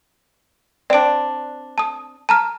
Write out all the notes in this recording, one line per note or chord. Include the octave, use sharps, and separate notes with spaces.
C4 D4 D5 D7
A5 D#6
A5 A#5 F6